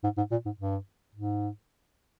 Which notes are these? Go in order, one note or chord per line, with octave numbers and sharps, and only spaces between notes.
G#2
G#2
A#2
G#2
G2
G#2